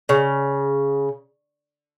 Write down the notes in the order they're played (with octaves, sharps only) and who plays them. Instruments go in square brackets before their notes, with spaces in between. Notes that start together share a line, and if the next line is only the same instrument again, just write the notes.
[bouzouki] C#3